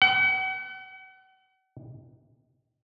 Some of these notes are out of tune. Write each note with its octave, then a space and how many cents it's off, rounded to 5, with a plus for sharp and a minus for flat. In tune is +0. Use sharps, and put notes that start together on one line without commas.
F#5 +40